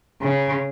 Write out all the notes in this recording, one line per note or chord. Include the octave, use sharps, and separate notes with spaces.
C#3